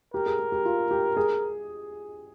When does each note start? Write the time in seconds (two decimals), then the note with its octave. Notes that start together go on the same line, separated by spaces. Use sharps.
0.14 G4 A#4
0.26 G#4
0.39 G#4
0.52 G4
0.65 F4
0.91 G4
1.17 G#4